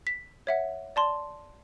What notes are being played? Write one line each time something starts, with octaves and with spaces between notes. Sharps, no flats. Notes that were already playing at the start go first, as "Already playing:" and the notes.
B6
C#5 E5 F#5
D5 A5 C6